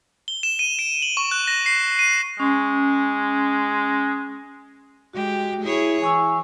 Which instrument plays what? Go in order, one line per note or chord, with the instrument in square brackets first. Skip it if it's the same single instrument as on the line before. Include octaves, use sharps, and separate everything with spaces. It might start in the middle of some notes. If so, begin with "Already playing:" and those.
[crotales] G7
E7
D#7
D7
F#7
C#6
F#6
A#6
C7
D#7
[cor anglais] G#3 [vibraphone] C#4
[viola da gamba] G#3 G4 [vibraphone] F#4
[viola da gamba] E4 G#4 C#5
[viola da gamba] E3 [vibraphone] G#5 C#6 E6